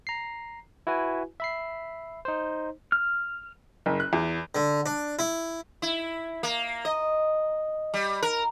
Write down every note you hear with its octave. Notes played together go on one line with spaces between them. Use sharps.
A#5 C7
E4 F#4 B4 G#5
E5 B5 C7
D#4 C5
F6
F#1
F#6
E2
D3
D4
E4
E4
A#3
D#5
G3
A#4